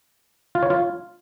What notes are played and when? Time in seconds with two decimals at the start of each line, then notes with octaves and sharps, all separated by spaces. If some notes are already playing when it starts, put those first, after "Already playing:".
0.55 F4
0.63 C#5
0.70 F4